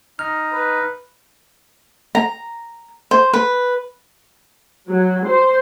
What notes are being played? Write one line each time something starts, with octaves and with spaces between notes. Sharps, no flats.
D#4 F6
B4
A#5
C5
B4
F#3
C5